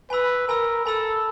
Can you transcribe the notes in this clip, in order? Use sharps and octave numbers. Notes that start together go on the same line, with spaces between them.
B4 G#5 B5 E6
A#4 G#5 B5 E6
A4 G#5 B5 E6